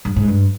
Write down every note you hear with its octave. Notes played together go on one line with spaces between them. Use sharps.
G2
G#2
G2